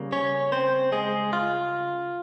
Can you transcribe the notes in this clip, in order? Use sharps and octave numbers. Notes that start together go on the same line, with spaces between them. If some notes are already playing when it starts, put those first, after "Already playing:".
Already playing: C#3 G3 A#3
C#4 C#5
C4 C5
G#3 G#4
F4